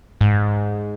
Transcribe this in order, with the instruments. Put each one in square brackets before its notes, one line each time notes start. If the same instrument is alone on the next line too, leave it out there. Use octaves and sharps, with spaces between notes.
[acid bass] G#2